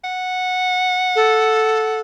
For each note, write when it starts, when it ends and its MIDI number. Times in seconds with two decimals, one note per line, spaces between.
0.04 2.00 78
1.16 2.01 69